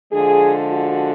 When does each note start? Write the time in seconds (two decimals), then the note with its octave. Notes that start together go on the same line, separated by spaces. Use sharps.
0.12 D3 F3 G#3 G#4
0.71 F#4